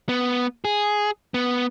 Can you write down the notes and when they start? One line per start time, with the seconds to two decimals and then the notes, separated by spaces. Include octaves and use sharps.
0.09 B3
0.65 G#4
1.34 B3